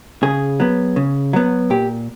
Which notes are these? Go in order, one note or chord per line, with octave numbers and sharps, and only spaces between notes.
C#3 G#4
F#3 B3
C#3
F#3 B3
A#2 G4